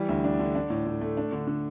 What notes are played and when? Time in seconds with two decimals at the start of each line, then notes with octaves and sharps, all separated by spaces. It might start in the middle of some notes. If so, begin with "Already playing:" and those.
Already playing: E3 G3
0.09 D2
0.24 D4
0.39 D3
0.55 D4
0.70 A2
0.86 A2
1.01 A3
1.17 D4
1.32 D3
1.47 D3